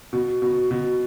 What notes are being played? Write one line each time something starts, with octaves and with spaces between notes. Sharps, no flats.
B2
B2
B2